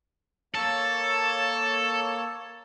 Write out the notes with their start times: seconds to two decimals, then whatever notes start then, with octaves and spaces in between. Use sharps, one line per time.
0.55 A#3 A4 C#5 A5